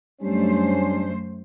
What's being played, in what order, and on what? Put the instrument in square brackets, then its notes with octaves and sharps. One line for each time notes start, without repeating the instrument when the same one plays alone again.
[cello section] F#2 A3 C5 [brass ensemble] G3 C#4 D4